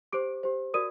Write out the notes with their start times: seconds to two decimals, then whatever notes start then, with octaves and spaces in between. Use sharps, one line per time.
0.12 G4 C5 D6 D7
0.43 G4 C5
0.74 F#4 A#4 D5 D#6 D#7